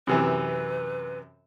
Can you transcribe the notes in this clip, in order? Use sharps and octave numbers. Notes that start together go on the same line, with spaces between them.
F#2 C3 E3 B4